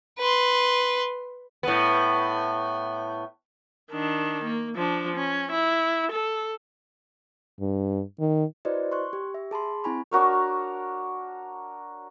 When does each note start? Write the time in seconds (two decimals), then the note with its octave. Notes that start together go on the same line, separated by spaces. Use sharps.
0.19 B4 C6
1.63 A2 B3
3.92 D#3 D4
4.45 A#3
4.76 F3 D4
5.16 C#4
5.52 E4
6.12 A4
7.60 G2
8.20 D#3
8.65 E4 F#4 B4 C5 D5 D#5
8.92 C6 C#6 F#6
9.13 G4
9.34 E5
9.51 G#4 A5 B5 C6
9.84 C4 E4 G#5 B5 C#6
10.11 D4 F#4 A#4 C#5